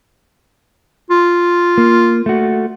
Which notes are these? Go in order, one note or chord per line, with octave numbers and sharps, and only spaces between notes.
F4
A#3
A3 F#4